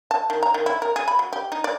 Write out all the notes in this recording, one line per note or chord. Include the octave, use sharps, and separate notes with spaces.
A5
D#3
A#5
D#3
E4
A#4
G#4
B5
F#3
G4
D#4
D5